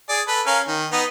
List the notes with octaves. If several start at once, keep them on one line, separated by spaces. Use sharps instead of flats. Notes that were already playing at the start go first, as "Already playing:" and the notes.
G#4 D5
A4 B4
C#4 A#4 F5
D#3
B3 D#4